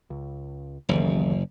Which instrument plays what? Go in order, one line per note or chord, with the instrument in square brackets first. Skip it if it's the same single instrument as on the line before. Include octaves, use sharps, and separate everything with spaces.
[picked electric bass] C#2
[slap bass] F#1 [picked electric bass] D2 D#3 E3